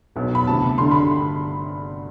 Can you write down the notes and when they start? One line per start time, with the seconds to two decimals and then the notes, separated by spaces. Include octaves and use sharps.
0.16 B1 B2 F#3 B3
0.35 B5
0.47 D2 C3 E3 A5
0.78 G1 G2 D3 C6
0.91 B5